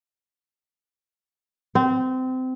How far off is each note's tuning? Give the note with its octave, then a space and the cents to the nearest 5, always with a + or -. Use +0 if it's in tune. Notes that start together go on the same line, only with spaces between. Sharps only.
C4 -25